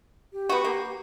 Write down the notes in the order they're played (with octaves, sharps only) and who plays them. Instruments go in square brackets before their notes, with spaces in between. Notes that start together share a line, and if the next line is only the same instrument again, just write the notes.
[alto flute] G4
[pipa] B3 F#4
A#3